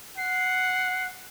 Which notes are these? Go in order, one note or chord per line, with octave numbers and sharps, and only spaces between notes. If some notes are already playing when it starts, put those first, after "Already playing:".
F#5 C7